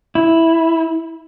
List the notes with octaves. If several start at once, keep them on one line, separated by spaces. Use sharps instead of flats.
E4